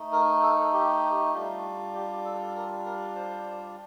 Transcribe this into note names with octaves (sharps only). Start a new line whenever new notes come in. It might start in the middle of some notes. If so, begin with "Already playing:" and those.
Already playing: A3 D#4
A#4
A4
G4
G3 D4 F4
G4
A4
A#4
A#4
C5